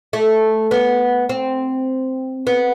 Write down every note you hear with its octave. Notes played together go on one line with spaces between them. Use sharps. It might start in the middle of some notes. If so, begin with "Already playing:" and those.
A3
B3
C4
B3